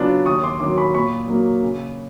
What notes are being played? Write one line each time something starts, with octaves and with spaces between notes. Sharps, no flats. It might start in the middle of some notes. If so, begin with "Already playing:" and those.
Already playing: C#3 F#3 B3 D4 F4
D#2 C#6 D#6
C6 D6
D#3 F#3 C6 D6
B5 C#6
A#2 B5 C#6
F#3 A#3 D#4
C#3